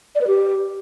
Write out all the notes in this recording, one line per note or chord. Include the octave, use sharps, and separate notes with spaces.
D5
B4
G4